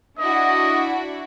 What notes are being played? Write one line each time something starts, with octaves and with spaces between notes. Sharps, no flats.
D4 E4 F#4 D#5